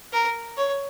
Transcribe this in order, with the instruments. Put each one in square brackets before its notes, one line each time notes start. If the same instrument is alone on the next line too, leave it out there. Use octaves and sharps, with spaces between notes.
[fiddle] A#4
C#5